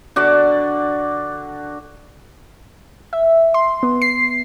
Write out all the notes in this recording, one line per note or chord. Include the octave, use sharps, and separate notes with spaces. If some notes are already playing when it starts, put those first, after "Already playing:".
D3 F#4 D5
E5
C6
B3
C7